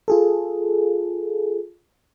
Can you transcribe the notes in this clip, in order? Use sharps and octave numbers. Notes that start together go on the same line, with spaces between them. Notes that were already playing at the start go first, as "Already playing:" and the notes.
F4 G#4 A4